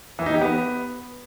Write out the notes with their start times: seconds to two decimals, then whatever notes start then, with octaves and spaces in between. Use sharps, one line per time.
0.19 E3
0.26 D#4
0.34 G4
0.41 B3